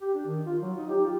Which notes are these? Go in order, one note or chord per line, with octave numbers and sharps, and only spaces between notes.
G4
D4
D#3
F4
F#3
D#4
G4
F4